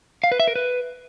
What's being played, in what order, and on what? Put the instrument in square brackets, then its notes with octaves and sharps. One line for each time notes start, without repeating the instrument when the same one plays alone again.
[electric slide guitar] F5
B4
E5
A#4
B4